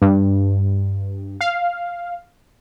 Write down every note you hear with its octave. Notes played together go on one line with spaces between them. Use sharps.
G2
F5